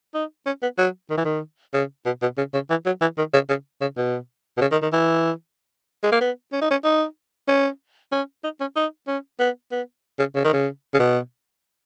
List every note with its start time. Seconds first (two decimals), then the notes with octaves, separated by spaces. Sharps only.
0.14 D#4
0.46 C#4
0.62 B3
0.78 F#3
1.10 D#3
1.17 E3
1.25 D#3
1.73 C#3
2.06 B2
2.22 B2
2.37 C#3
2.54 C#3
2.70 E3
2.86 F#3
3.01 E3
3.18 D#3
3.33 C#3
3.49 C#3
3.81 C#3
3.97 B2
4.57 B2
4.61 C#3
4.72 D#3
4.82 D#3
4.93 E3
6.03 G#3
6.12 A#3
6.21 B3
6.52 C#4
6.61 D#4
6.71 C#4
6.84 D#4
7.48 C#4
8.12 C#4
8.44 D#4
8.60 C#4
8.76 D#4
9.07 C#4
9.40 B3
9.72 B3
10.19 C#3
10.35 C#3
10.44 D#3
10.53 C#3
10.94 C#3
10.99 B2